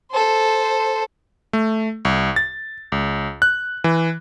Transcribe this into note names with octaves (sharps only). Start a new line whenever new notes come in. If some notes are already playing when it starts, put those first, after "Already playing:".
A4 C5
A3
C2
A6
C#2
F#6
E3